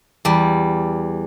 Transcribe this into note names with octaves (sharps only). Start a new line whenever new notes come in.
E2 G3